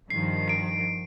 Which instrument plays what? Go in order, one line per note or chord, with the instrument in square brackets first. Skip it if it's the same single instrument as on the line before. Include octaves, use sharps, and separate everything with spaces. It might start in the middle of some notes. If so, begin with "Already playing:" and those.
[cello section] G2 D#3 F3 [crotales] C7
[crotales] C7 D7